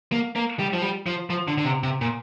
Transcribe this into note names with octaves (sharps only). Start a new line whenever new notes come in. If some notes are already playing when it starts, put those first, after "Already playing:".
A#3
A#3
G3
F3
G3
F3
F3
D3
D3
C3
C3
A#2